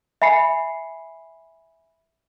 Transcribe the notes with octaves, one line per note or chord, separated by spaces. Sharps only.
E5 G#5 B5 C7 C#7